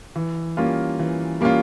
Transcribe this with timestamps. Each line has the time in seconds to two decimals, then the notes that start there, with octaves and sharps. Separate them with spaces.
0.15 E3
0.57 G3 A#3 C#4 F4
0.99 E3
1.41 G3 A#3 C#4 F4